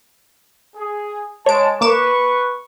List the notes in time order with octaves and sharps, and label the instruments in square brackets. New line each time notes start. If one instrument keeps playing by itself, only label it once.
[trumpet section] G#4
[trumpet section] G#3 A5 [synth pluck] C#5 D7
[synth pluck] A#3 D6 E7 [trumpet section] B4 C#6